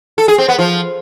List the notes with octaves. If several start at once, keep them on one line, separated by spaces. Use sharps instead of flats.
A4
G#4
C4
B3
F3